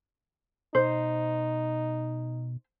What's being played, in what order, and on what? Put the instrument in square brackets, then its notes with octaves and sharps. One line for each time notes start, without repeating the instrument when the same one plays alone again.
[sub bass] B2 [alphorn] D#4 [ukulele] C5